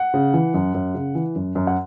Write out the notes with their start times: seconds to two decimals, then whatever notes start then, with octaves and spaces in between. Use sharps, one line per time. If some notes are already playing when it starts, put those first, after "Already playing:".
Already playing: F#5
0.14 C#3
0.34 E3
0.54 F#2
0.74 F#2
0.94 C#3
1.15 E3
1.36 F#2
1.55 F#2
1.67 F#5